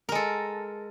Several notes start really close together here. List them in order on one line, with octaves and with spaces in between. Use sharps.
A#4 G#3 A4